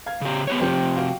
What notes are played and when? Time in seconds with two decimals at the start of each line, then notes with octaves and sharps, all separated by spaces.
0.06 F5 G#6
0.21 C#3 G4
0.47 B3 G4 C#5
0.60 F2 C3 F3 G4
0.97 F#4 F5 G5